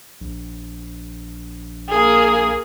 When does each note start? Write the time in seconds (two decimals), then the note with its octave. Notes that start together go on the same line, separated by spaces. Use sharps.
0.21 A#1
1.89 A#3 G#4